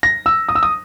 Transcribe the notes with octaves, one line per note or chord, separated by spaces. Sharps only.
A#6
E6
D#6
E6
D#6